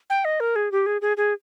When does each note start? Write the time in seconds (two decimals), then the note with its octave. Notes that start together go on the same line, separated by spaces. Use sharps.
0.10 G5
0.25 D#5
0.40 A#4
0.56 G#4
0.72 G4
0.86 G#4
1.01 G#4
1.17 G#4